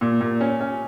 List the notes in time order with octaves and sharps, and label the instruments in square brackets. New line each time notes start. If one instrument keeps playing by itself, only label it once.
[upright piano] A#2
A#2
C#4
C#4